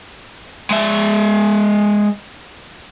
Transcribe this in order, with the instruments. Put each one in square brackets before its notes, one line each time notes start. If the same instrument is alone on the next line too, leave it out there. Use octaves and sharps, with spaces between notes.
[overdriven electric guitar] G#3 E5